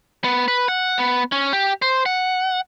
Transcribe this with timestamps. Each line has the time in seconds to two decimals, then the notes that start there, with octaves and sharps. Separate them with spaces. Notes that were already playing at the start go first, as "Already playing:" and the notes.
0.24 B3
0.48 B4
0.68 F#5
0.99 B3
1.32 C#4
1.53 G4
1.82 C5
2.06 F#5